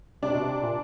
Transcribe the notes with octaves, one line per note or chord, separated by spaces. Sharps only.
C3 D4
B2
C3
A#2